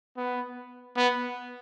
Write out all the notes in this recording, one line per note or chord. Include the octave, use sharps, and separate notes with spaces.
B3
B3